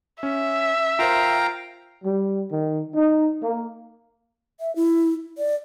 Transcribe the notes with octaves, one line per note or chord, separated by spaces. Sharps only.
C#4 E5
F4 A#4 C5 F5 G5 A#5
G3
D#3
D#4
A#3
E5
E4
D5